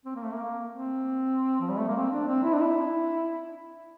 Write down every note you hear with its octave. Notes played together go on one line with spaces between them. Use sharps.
C4
A#3
A3
A#3
C4
F3
G3
A3
A#3
C4
D4
C4
E4
D4
E4